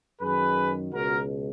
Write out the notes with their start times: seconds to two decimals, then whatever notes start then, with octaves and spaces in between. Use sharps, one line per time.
0.21 F#2 D#3 G#4 B4
0.92 C#2 B2 F#4 A#4